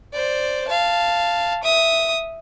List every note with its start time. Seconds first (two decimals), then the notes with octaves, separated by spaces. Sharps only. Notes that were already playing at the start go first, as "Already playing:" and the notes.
0.13 C5 D5
0.68 F5 A5
1.63 E5 D#6